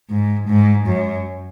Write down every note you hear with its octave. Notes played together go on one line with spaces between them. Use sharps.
G#2
G#2
F#2